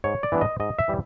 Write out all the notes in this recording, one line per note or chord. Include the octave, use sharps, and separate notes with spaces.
G#2 C#5
D5
E3 G3 B3 D4
D#5
G#2 D#5
E5
E3 G3